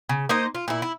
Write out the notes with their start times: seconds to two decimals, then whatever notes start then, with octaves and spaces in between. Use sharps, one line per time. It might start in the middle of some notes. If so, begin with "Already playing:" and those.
0.09 C#3
0.29 A#3 D#4 C5 D#5
0.55 F4
0.68 A#2 E4
0.82 E4